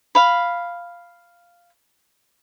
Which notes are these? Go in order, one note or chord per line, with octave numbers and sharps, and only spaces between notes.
F5 B5